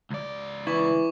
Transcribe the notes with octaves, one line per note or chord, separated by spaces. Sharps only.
C#2 D5
E3 E4 C#6 D6